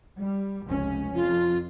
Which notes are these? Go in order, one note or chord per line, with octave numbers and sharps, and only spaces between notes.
G3
F1 C#2 C#4
F2 F4